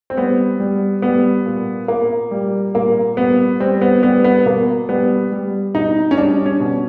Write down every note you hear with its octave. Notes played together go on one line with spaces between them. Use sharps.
C4
G3 B3
G3
G3 B3
A#2
A#2 A#3
G3
A#2 A#3
G3 B3
G3 C4
B3
G3 B3
B3
B2 A#3
G3 B3
G3
B2 D#4
C#4
G3 D4
C#4
B2